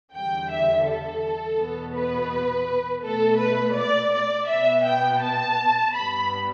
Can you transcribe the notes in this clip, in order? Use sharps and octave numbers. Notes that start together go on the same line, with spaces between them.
E2 D3 G3 G5
E5
A4
E2 B2 B3
B4
B2 A3 A4
B4
D5
D5
B2 B3 E5
G5
A5
G2 G3 B3 B5